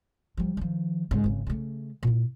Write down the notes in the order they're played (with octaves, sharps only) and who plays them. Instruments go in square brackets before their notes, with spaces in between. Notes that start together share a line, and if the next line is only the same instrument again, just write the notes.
[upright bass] F3 G3
D#3 F3
G#2 C#3
G#1 C#3
C#3 A3
A#2 E4